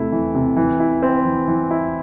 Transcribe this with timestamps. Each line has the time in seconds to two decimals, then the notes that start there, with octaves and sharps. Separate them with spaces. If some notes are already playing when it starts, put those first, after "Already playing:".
Already playing: C3 A3 E4
0.12 E3
0.35 C3
0.57 E3
0.80 E4
1.02 C4
1.25 E3
1.48 E3
1.71 E4